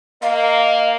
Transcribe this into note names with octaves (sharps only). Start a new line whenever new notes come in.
A#3 D#5 F5